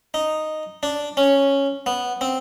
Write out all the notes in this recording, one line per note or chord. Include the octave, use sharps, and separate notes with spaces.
D#4
D4
C#4
B3
C4